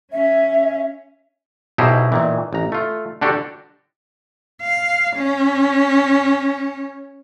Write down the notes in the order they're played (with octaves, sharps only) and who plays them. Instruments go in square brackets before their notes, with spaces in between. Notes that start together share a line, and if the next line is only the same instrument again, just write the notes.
[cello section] C#4 [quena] E5
[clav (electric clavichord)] B1 B2 D#4 E4 G4 C5
A#2 D#3 E3
A1 A#5
A3 F4
D3 D4 F#4 G4 A4
[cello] F5
C#4